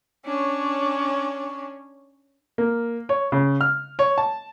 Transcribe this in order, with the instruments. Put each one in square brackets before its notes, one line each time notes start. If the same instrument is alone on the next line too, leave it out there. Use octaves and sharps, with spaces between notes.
[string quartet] C#4 D4 C#5
[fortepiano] A#3
C#5
C#3
F6
C#5
A5